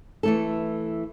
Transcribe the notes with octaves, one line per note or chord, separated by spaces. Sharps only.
E3 A3 A4